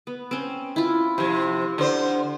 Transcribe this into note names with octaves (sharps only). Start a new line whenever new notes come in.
B3
C4 C#4
E4 F4
C3 F3 G4
D3 C5